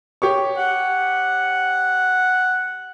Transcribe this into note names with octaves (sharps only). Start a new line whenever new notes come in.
G4 C#5 C#6
F#5